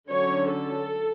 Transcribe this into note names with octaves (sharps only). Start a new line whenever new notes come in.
D3 F#3 C#4 C#5
A4